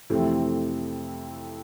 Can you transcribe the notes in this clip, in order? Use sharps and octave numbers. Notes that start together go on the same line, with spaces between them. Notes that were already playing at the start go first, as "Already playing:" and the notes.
F2 C3 E3 A3 C4